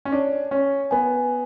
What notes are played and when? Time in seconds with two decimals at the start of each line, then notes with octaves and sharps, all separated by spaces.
0.05 C#4
0.12 D4 C#5
0.51 C#4 C#5
0.91 B3 G#5